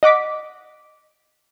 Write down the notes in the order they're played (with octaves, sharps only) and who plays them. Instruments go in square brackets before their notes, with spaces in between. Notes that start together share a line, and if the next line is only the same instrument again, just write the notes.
[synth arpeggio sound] D#5 F#5 D6 B6